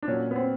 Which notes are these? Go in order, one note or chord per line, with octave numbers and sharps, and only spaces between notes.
D4
A#2 F#3 C#4
B3
C4